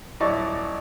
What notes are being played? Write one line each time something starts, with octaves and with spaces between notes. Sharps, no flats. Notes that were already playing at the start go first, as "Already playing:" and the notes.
D#1 F#3 E4 D5 D#5 C#6